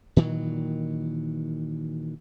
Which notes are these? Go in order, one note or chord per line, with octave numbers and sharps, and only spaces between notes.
A#2 D#3 E3 F#3